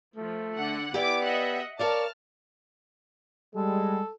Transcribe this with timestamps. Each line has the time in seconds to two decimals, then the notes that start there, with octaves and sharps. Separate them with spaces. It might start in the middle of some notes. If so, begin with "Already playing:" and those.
0.16 F3 A3
0.57 D3 F#5
0.94 B3 E4 G4 D5 D6
1.25 D#5 E5 F#5
1.79 A#4 C#5 D5 F5 A5 F6
3.55 G3 G#3 A4